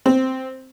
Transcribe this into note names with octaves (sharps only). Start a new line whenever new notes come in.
C4